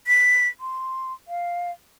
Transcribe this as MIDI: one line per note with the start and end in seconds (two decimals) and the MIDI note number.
0.07 0.48 95
0.60 1.13 84
1.28 1.71 77